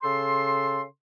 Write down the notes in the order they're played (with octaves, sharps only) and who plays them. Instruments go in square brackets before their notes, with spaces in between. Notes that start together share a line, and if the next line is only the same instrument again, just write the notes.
[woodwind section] C#3 A4 C6